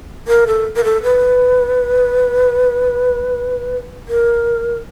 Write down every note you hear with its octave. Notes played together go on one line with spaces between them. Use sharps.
A#4
A4
A#4
A4
B4
A#4